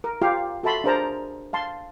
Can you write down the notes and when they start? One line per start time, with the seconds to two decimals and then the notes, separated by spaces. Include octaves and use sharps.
0.04 A#4
0.22 F4 G4 F5
0.63 F#4 A4 E5 A5 B5 C6
0.84 D4 G#4 A#4 C5 A5 A#5
1.53 F5 A5 C6